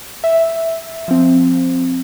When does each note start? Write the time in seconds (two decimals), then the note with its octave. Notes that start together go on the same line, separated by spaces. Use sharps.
0.24 E5
1.08 F3 C4